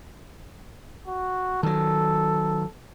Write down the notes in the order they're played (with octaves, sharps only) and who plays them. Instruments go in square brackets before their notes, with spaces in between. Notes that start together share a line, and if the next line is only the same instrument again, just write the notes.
[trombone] F#4
[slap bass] D#3 F#3 [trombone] A4